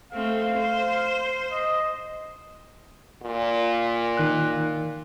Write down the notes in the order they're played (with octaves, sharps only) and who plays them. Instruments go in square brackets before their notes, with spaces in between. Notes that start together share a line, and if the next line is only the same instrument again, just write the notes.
[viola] A3 C4 [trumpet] F5
[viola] C5
[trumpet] D#5
[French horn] A#2
[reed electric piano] D#3 F#6